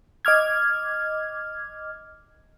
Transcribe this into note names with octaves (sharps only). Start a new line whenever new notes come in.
D#5 D6 F6 G#6